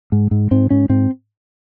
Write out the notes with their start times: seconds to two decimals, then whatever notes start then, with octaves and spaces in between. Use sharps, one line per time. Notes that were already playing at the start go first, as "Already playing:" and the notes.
0.12 G#2
0.31 G#2
0.51 G#2 C4
0.70 G#2 C#4
0.89 G#2 C4